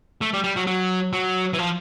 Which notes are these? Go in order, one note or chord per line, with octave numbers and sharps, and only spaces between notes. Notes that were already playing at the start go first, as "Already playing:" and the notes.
A3
G3
G3
F#3
F#3
F#3
E3
F3